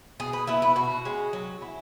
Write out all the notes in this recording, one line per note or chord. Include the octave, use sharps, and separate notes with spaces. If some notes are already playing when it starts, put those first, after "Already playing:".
B2 G#4
B4
B3 E4 E5
B4
B2 F#4
G#3 C#4
F#3
C#4 E4